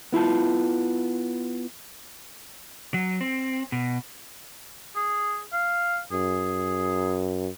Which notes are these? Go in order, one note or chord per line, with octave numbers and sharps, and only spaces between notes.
B3 E4 F4 A5
F#3
C4
B2
G#4
F5
F#2 G#4